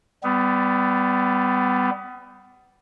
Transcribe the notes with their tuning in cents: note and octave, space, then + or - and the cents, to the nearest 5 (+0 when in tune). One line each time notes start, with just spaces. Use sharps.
G3 +0 B3 +25